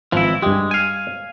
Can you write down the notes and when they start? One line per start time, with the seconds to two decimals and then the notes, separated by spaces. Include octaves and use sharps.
0.12 G#1 E3 F3 E4 F4
0.42 G2 G#3 G4
0.71 F5 G#5